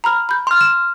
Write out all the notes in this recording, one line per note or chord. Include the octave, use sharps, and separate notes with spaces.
A#5 B5 F6
B5 G6
C6 F6
E7